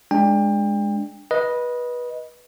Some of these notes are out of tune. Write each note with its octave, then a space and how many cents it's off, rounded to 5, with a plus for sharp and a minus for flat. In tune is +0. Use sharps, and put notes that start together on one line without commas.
G#3 +0 D4 +0 G5 +30
B4 -20 D#5 +0